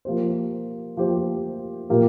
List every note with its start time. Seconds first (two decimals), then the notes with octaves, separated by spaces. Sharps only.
0.05 F3 A#3 G4 C5
0.97 F3 A#3 G4 C5
1.89 A#2 A#3 G4 A#4